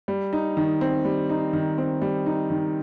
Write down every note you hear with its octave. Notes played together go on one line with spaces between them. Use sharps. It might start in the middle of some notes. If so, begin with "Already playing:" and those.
G3
D#4
D#3
C4
G3
D#4
D#3
C4
G3
D#4
D#3